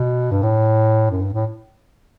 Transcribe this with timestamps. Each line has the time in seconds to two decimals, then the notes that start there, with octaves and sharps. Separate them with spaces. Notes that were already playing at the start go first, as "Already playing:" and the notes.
Already playing: B2
0.31 G2
0.43 A2
1.11 F#2
1.22 G2
1.33 A2